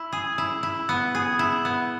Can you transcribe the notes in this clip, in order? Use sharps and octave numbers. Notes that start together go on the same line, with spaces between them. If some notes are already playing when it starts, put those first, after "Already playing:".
Already playing: E4
G#4
E4
E4
B3
G#4
E4
B3